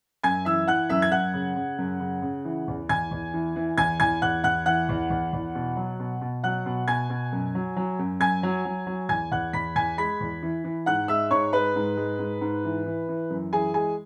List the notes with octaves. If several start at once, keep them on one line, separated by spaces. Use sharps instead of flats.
F#2 G#5 G#6
E3 E5 E6
E3 F#5 F#6
F#2 E5 E6
G#6
F#2 F#5 F#6
C#3
C#3
F#2
C#3
C#3
E3
E2
E2 G#5 G#6
E2
E3
E3
E2 G#5 G#6
E2 G#5 G#6
E2 F#5 F#6
E2 F#5 F#6
E3 F#5 F#6
E2
E2
E2
B2
F#3
B2
B2
F#3 F#5 F#6
B2
B2 G#5 G#6
B2
F#2
F#3
F#3
F#2
F#2 G#5 G#6
F#3
F#3
F#3
E2 G#5 G#6
E2 F#5 F#6
E2 B5 B6
E2 G#5 G#6
G#3 B5 B6
E2
E3
E3
G#2 F#5 F#6
G#3 E5 E6
G#2 C#5 C#6
G#3 B4 B5
G#2
G#3
G#2
G#2
E3
E3
E3
F#2
E3 G#4 G#5
G#3 G#4 G#5